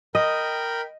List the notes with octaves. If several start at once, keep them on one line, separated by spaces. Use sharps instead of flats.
A#4 D#5 G5 B5